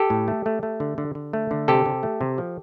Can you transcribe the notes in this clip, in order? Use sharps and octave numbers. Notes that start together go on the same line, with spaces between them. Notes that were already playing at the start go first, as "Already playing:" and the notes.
Already playing: G4 A4
A2
A3
A3
A3
D3
D3
D3
A3
D3
C3 G4 A4
C3
A3
C3
F3